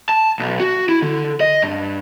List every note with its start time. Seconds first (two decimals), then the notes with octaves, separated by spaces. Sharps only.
0.09 A5
0.39 B1
0.60 F#4
0.89 E4
1.02 D3
1.40 D#5
1.62 G2